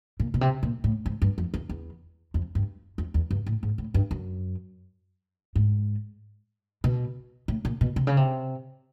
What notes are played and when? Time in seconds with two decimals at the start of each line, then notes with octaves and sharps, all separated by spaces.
0.20 A#2
0.34 B2
0.41 C3
0.63 A#2
0.84 A2
1.06 G#2
1.22 G2
1.38 F2
1.54 E2
1.69 E2
2.34 F2
2.55 G2
2.98 F2
3.14 E2
3.31 G2
3.46 A2
3.63 G#2
3.78 A2
3.94 G2
4.11 F#2
5.56 G#2
6.84 B2
7.48 A2
7.65 A#2
7.81 B2
7.96 C3
8.07 C#3
8.17 C3